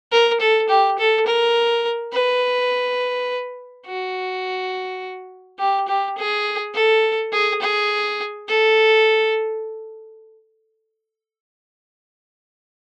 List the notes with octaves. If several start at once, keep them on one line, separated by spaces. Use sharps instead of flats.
A#4
A4
G4
A4
A#4
B4
F#4
G4
G4
G#4
A4
G#4
G#4
A4